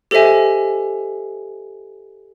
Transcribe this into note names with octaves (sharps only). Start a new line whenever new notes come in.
G4 A4 C5 D#5 E5 G#5